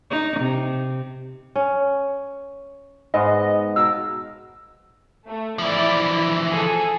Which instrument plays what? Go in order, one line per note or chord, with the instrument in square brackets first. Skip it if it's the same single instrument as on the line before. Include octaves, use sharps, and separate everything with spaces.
[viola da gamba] D#4
C3
[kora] C#4
[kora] G#2 G#3 B3 [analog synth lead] D#5
[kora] B2 A#4 F5 [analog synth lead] E6
[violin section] A3
[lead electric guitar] E3 F3 [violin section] E4 D5
[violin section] E4
G#4 A4